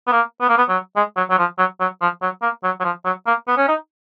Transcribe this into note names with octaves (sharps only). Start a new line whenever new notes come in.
B3
A#3
B3
A#3
B3
F#3
G#3
F#3
F#3
F3
F#3
F#3
F3
F#3
A#3
F#3
F#3
F3
F#3
A#3
B3
C#4
D#4